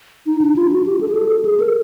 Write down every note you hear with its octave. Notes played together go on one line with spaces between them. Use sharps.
D#4
D4
F4
F#4
G4
A4
G#4
A4
G#4
A#4